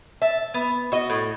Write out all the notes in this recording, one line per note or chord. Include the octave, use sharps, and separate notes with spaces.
E5 A5
B3
F#4 D#5
A2